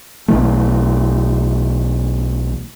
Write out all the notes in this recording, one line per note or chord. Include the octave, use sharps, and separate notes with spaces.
B1 B2 E3 A3